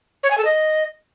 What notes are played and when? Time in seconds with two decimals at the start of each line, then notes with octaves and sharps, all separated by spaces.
0.23 C#5
0.31 G#5
0.38 A4
0.45 D#5